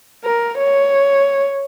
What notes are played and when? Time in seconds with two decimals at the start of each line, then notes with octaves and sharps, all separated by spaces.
0.25 A#4
0.59 C#5